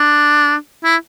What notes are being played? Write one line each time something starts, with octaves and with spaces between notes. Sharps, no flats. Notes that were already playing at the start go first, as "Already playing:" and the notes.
Already playing: D4
E4